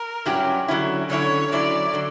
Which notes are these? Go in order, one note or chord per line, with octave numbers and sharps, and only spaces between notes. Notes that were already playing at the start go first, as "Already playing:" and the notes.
Already playing: A#4
G2 F#3 C#4 E4 G4
D3 F#3 C#4 E4
D3 F#3 C#4 E4 C#5
D3 F#3 C#4 E4 D5
D3 F#3